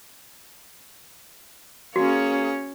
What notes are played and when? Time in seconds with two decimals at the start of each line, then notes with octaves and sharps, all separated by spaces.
1.96 A#3 C#4 F#4 G#4 C#5